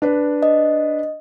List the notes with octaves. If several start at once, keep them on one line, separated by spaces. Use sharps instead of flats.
D4 B4
D#5